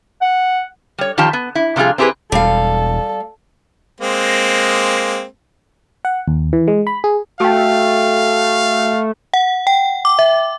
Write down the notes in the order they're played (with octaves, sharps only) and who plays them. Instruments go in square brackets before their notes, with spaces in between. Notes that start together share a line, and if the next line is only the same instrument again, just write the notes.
[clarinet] F#5
[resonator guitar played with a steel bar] G3 C#5
D#3 F3 F4 G4 A5
B3
E4
C3 F3 G3 F4 G#4
C4 E4 G4 G#4 B4
[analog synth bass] E1 [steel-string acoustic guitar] G3 F5 [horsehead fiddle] A4
[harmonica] G#3 A#3 C4
[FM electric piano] F#5
D#2
E3
G#3
B5
G#4
[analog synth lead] A3 [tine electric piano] F#4 G5 [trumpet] F5
[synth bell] F#5
G5
D6
E5